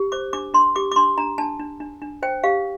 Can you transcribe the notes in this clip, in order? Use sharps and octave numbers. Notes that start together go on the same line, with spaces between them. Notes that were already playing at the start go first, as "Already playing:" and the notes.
Already playing: G4
C5 D6
D4 D6
D4 C6
G4 D6
D6
D4 C6
D4 A#5
D4 A5
D4
D4
D4
C5 G5
G4 F5